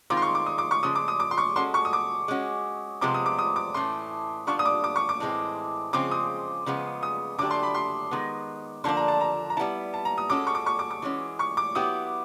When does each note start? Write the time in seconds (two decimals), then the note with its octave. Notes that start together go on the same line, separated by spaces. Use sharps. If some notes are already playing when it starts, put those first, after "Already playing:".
0.10 D#3 G#3 C4 F4 D6
0.17 C6
0.22 C#6
0.35 D6
0.46 D#6
0.58 D6
0.71 C#6
0.83 C#3 F3 G#3 D#6
0.95 D6
1.08 D#6
1.20 D6
1.31 C6
1.37 C#6
1.56 G#3 C#4 F#4 A4 C6
1.74 C#6
1.85 D#6
1.93 D6
2.28 G#3 C#4 F#4
3.01 C3 F3 G#3 B3 D6
3.14 D#6
3.26 D6
3.39 D#6
3.56 D6
3.74 A2 E3 A3 C#4 C6
4.47 D3 G3 B3 D4 F4 C#6
4.59 D#6
4.65 D6
4.84 D6
4.96 C#6
5.09 D6
5.20 A2 E3 G#3 C4
5.93 C#3 F3 G#3 C4 D6
6.11 D#6
6.66 C#3 F3 G#3 B3
7.03 D#6
7.38 D3 F#3 A3 D4 G4 D6
7.51 C6
7.63 B5
7.74 C6
8.11 D#3 G#3 B3
8.84 D3 F3 A#3 D4 C6
8.97 A#5
9.08 A5
9.21 A#5
9.50 A#5
9.57 E4 A5
9.60 G3 B3
9.94 A5
10.05 A#5
10.18 D#6
10.30 G#3 C#4 F#4 A4 D6
10.47 C#6
10.55 D6
10.66 C#6
10.79 D6
10.91 D6
11.02 E3 G#3 C#4 F#4
11.39 C#6
11.57 D6
11.75 F#3 B3 E4 G4 D#6